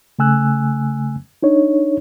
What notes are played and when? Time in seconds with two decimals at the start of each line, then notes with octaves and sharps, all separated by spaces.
0.19 C#3 A3 G#5 E6 F#6
1.43 D4 D#4 C#5